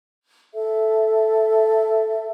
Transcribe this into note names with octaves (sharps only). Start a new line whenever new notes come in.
A4 E5